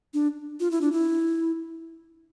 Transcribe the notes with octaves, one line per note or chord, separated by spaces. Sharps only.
D4
F4
E4
D4
E4